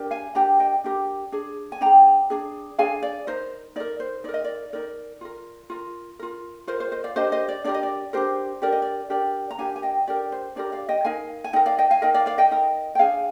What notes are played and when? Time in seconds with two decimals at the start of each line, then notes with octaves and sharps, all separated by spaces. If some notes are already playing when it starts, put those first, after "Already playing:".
Already playing: D4 G4 A#4
0.11 F5 G#5
0.35 D4 G4 A#4 G5 A#5
0.59 D#5 G5
0.84 D4 G4 A#4
1.32 D4 G#4
1.72 G#5
1.81 D4 G#4 G5 A#5
2.30 D4 G#4
2.78 D4 G#4 F5 G#5
3.02 D5
3.27 D#4 A#4 C5
3.76 D#4 A#4 D5
4.00 C5
4.24 D#4 D5
4.29 A#4
4.34 D#5
4.44 D5
4.73 D#4 A#4 D5
5.21 F4 A#4
5.70 F4 A#4
6.19 F4 A#4
6.67 F4 A#4 C5
6.80 C5
6.92 C5 D#5
7.04 D5 F5
7.16 D4 G4 A#4 C5 D#5
7.32 C5 D#5
7.48 D5
7.64 D4 G4 A#4 D5
7.74 D#5
7.83 D5
8.13 D4 G4 A#4 C5
8.62 D4 G4 A#4 D5
8.72 D#5
8.82 D5
9.10 D4 G4 A#4 D5
9.51 A#5
9.58 D4 G4 A#4 F5 G#5
9.76 G#5
9.83 D#5 G5
10.07 D4 G4 A#4 D5
10.32 C5
10.56 D4 G4 A#4 D5
10.72 D5 F5
10.89 D#5 G5
11.05 D#4 A#4 F5 G#5
11.44 G#5
11.53 D#4 A#4 D#5 G5
11.66 D5 F5
11.78 D#5 G5
11.91 F5 G#5
12.02 D#4 A#4 D#5 G5
12.14 D5 F5
12.26 D5 F5
12.38 D#5 G5
12.51 D#4 A#4
12.95 G5
12.99 D4 G#4 F5 G#5